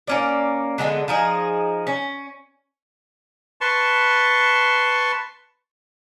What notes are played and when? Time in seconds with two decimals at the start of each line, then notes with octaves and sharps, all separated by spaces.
0.07 A#3 C#4 D5
0.78 D3 G#3 A#3 B3
1.08 F3 D#4 G#4
1.87 C#4
3.61 B4 A5 C6 C#6